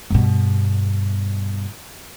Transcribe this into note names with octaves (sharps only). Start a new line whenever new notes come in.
G2 B2